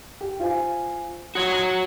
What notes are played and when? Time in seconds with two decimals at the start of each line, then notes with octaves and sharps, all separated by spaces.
0.21 G4
0.40 F4 C5 G#5
1.35 F#4 C#5 C6 D#6
1.52 A#5 A#6 D#7